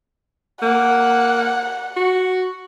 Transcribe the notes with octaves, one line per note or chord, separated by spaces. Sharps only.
A#3 F#5
F#4